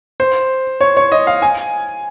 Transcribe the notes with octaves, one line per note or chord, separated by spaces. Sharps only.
C5
C#5
C#5
D#5
F5
G#5